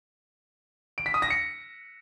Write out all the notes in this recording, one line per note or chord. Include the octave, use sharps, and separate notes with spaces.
D7
B6
D#6
A#6
C#7